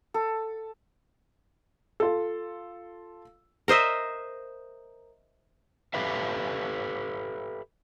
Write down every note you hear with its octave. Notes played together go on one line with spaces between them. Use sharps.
A4
F4 A4
A#4 C5 D#5 E5
G4 A4 B4 E5 F5